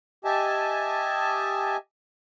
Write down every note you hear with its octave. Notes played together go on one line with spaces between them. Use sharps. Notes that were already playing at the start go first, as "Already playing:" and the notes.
G4 D#5 E5 G#5 A5